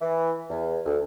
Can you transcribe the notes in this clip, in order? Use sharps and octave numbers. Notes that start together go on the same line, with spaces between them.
E3
E2
D2